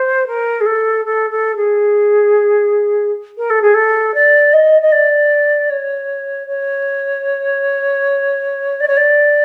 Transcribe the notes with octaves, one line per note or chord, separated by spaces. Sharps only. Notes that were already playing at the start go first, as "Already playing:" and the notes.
Already playing: C5
A#4
G#4
A4
A4
A4
G#4
A#4
A4
G#4
A4
D5
D#5
D#5
D5
C#5
C#5
D5
C#5
D5